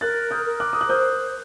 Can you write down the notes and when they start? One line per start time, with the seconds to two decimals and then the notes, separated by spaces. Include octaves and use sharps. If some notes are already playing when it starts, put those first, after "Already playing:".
0.01 A#4 F#6 A6
0.31 D#6 G6
0.45 A#4
0.60 D6 F#6
0.73 D#6
0.81 F#6
0.89 C5 D#6 G6